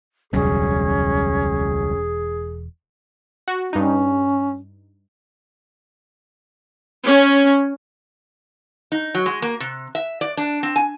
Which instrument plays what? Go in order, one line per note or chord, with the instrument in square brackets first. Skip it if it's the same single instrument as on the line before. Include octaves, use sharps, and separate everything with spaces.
[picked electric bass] E1 [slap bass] C#2 F#3 G3 [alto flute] C#4 [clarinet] G#4
[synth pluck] F#4
[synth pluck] G2 D#4 [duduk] C#4
[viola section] C#4
[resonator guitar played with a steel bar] D#4
F#3
G#3
A#3
C3
E5
D5
D4
C4
G#5